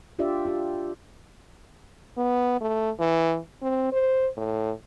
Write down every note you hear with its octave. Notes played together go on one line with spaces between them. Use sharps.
D4 F4 G4 D5 E5
F4 G4
B3
A3
E3
C4
C5
A2